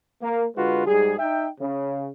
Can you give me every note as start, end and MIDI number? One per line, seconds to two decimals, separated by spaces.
0.22 0.46 58
0.56 0.86 50
0.56 0.86 56
0.56 0.86 65
0.56 0.86 66
0.56 0.86 71
0.87 1.15 44
0.87 1.15 55
0.87 1.15 68
1.19 1.49 63
1.19 1.49 76
1.19 1.49 79
1.60 2.10 49